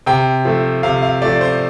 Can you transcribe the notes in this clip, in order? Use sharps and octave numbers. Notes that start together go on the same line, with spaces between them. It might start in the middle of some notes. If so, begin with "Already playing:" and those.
C3 G5
F3 A3
C3 F5
F5
F3 A3 D5
C5